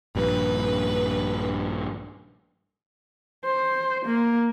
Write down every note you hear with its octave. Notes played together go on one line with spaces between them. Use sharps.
A#1 G2 B4
C5
A#3